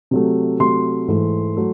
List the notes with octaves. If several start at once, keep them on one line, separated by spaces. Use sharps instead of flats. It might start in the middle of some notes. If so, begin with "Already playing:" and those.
C3 F#3 A3
C3 F#3 A3 C6
G#2 E3 A3
F#3 A3